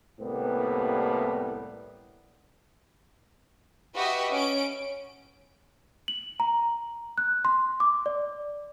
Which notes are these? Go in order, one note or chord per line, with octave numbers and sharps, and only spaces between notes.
C2 A2 G3 A#3 B3
F#4 G4 B4 D#5 E5 F#5
C#4 D7
F#7
A#5
F#6
C6
D6
D5